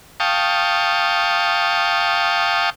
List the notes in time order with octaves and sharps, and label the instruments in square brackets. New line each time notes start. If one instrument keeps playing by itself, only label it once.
[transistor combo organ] F5 G5 A5 C#6 D#6